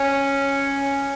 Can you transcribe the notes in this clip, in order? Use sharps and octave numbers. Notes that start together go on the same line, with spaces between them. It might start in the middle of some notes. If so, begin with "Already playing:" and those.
Already playing: C#4